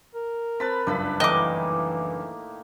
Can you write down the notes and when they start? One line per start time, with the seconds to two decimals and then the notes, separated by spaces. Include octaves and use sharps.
0.15 A#4
0.60 C4 B4 A5 B5
0.87 F#1 C#2 G2 D4 B4 B5
1.20 A2 D#3 E3 A#3 D#5 D6